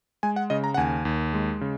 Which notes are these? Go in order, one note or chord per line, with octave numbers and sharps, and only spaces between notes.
G#3 G#5
F#5
C#3 D#5
A#5
F#5
D#2 G#5
D#2
G#3
C#3